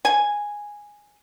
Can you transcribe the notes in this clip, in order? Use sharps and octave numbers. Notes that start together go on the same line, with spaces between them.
G#5